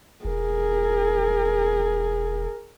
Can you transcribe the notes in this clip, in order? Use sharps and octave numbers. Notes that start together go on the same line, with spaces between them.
E1 G#4 A#4